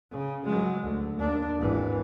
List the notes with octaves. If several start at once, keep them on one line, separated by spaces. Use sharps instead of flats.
C#3
F#3 G#3
D2
D#2 D4
G#1 E3